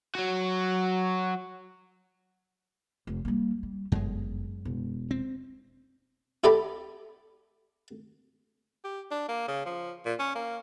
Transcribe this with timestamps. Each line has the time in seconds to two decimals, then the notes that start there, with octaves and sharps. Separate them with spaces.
0.15 F#3 F#4
3.07 F1
3.25 G3 A#3
3.63 G3
3.92 G1 F#2 G#3
4.65 E1
5.11 C4
6.44 E4 G4 A4 D5 A#5 B5
8.84 G4
9.11 D4
9.28 A#3
9.48 C#3
9.66 F3
10.06 A#2
10.19 C#4
10.35 A#3